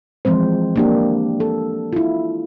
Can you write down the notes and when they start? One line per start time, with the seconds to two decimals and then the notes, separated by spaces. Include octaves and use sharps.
0.25 E3 F3 G#3 C4 C5
0.76 A#3 D4 G4
1.40 A4
1.93 E4 F4